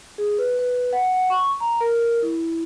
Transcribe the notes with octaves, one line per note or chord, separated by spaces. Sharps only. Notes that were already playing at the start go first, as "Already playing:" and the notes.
G#4
B4
B4
F#5
F#5
C#6
A#5
A#4
E4